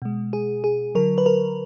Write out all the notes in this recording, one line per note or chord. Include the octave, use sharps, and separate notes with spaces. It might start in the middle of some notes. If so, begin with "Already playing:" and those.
B2 G#3
G#4
G#4
D3 F#3 A#4
B4
A#4